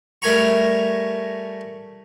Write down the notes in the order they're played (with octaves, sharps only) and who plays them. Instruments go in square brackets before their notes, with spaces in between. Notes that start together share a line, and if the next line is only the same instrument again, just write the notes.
[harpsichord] G3 A3 A#4 G#5 A#5 C#6